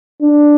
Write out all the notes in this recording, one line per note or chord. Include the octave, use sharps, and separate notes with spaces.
D4